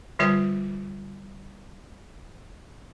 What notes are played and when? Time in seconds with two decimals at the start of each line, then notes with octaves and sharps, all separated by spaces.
0.19 D3 G3 F4 B4 C#5